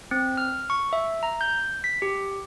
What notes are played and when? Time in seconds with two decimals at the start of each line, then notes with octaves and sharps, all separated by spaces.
0.11 C4
0.37 F6
0.70 C#6
0.93 E5
1.23 A#5
1.41 G6
1.84 B6
2.02 G4